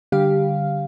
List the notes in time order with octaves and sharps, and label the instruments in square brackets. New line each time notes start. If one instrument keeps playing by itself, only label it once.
[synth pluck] D3 G3 G4 F5